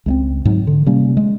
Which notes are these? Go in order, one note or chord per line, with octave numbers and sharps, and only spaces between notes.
C#2 G#3 C4
G#2 F#3
D3
C3 G3 A#3 C#4
G#3